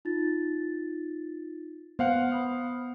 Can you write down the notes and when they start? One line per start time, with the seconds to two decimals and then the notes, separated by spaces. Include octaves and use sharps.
0.05 D#4 F4 A6
1.99 B3 C5 F5 F#5
2.32 B5 D#6